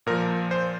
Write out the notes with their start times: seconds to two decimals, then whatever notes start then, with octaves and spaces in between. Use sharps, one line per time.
0.07 A#2 F3 A#4
0.51 C5